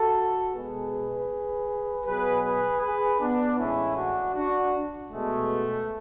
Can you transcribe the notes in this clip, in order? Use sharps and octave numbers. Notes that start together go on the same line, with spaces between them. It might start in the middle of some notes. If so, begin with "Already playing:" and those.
Already playing: F#4 A4
B2 G#3 G#4 B4
B2 F#3 G#4 B4
G#4 B4
G#4 B4
B3 D4
A2 E3 G#3 C#4 E4
D4 F#4
D4 F#4
B2 G#3 A3